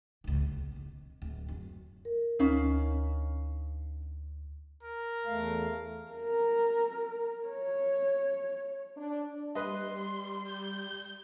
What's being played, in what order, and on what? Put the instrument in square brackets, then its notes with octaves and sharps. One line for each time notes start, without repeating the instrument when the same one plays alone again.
[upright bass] C#2 G#2
A#1
C3 D#3
D1
F#2
[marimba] A#4
[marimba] D2 [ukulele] C#4 D#4 F5
[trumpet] A#4
[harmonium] E2 A3 F5
[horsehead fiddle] A#4
C#5
[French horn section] D4
[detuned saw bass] G3 [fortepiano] B4 D#5 [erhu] C6
[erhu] G6